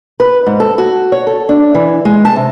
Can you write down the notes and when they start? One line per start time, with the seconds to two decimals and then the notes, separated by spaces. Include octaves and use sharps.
0.20 B4
0.46 G#2
0.60 A4
0.78 F#4
1.12 C#5
1.27 A4
1.49 D4
1.75 E3
2.05 G#3
2.25 A5
2.36 C3